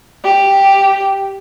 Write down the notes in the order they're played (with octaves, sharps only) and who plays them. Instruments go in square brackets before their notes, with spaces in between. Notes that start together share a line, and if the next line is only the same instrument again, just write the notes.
[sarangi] G4